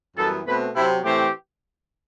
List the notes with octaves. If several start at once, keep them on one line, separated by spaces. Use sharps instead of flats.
F#2 E3 G3 B3 A4
B2 A3 C4 B4
C3 F#3 C4 E4
A2 E3 A3 C4 G4